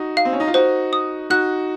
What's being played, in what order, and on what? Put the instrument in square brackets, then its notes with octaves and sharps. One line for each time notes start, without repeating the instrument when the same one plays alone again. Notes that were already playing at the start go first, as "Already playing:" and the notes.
Already playing: [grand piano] D#4 F#4
[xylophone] F5
[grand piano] C4
C#4
D#4
F4
[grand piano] D#4 F#4 [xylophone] C5
[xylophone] D#6
[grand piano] D#4 F#4 [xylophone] F#6